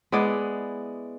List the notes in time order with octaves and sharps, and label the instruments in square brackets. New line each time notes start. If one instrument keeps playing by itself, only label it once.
[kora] G#3 B3 E4 D5